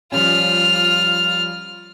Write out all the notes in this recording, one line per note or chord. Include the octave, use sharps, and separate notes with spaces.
F3 G3 C#4 F4 F6